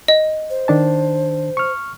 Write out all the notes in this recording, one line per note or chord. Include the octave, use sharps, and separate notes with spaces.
D#5
C5
D#3 D4 A5
C#6 F6